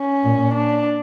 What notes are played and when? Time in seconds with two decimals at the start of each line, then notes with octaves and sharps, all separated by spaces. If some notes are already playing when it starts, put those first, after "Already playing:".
Already playing: C#4
0.24 A#2
0.54 D4